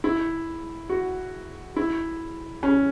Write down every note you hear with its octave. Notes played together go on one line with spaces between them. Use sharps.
E4
F#4
E4
C#4